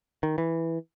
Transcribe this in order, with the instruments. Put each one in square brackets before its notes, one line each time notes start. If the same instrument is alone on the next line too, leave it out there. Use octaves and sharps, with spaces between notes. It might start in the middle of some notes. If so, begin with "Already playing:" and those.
[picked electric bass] D#3
E3